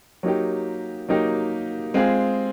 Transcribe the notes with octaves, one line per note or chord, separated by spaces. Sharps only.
F#3 A#3 D#4 G4
F#3 A#3 D#4 G4
G#3 C4 F4 G#4